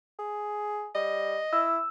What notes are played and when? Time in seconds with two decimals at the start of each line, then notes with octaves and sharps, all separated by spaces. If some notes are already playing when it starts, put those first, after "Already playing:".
0.19 G#4
0.95 G3 D#5
1.53 E4 E6